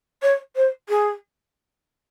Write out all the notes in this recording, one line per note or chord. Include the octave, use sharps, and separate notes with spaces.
C#5
C5
G#4